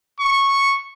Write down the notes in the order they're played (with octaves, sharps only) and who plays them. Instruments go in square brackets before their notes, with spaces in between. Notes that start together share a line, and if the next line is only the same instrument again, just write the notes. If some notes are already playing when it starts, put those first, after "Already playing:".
[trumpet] C#6